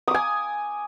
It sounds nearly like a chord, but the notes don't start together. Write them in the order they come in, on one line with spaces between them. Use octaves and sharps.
D#6 D6 G#5